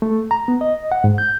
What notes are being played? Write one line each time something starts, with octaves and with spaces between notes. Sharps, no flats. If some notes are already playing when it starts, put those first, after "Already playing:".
A3
A#5
B3
D#5
F#5
G#2
G6